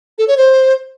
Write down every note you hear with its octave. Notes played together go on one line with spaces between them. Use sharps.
A4
C#5
C5